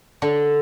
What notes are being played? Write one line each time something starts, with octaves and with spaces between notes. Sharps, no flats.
D3